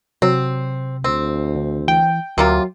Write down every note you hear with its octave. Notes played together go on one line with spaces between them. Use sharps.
C3 F#3 C4
D2 C4
D3
E3 G5
D2 C3 F#3 A#3 F4